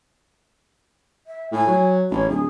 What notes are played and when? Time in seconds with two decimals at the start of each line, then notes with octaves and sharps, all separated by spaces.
1.27 E5
1.52 A2 G#5
1.67 F#3
2.11 A1 C#4
2.30 D1 G#4